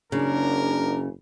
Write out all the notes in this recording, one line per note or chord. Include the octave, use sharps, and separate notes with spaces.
F#1 C#3 D4 A#4